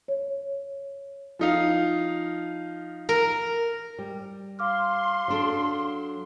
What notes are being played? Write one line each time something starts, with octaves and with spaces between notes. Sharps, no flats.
C#5
F3 D#4 F5
A#4
G3
F5 C6 D6 F6
F#3 D4 A4